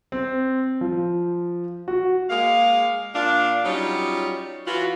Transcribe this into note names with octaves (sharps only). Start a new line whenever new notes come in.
C4
F3
F#4
G#3 A#3 F5
A#2 D4 F5
F#3 G3 C#4 D#4 F4 C#5
E3 F4 F#4